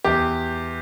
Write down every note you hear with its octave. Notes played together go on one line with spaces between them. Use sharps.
E2 G4